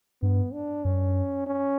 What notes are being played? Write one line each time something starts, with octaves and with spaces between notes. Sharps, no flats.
G2 B3
D4
F#2 C#4
C#4